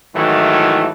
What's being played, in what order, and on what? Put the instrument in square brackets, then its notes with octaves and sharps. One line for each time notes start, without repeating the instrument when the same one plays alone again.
[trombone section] G#2 D#3 E3 F#3 A3 E4